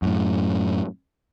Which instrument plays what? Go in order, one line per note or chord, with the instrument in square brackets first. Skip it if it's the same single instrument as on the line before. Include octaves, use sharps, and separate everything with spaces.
[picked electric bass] F#2 A2